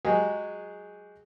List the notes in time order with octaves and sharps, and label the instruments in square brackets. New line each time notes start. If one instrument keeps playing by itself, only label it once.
[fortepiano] F#3 G#3 G4 G#4